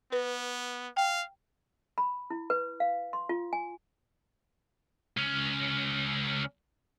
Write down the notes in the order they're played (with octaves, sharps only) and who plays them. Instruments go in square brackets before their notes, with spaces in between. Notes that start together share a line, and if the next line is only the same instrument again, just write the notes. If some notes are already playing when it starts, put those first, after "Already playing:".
[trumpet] B3 [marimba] B4
[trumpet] F5 [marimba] G5
[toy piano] B5
E4
B4
F5
C6
F4
G#5
[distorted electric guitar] C#2 C#4